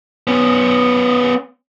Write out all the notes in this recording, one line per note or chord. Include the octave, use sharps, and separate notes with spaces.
B3 C#4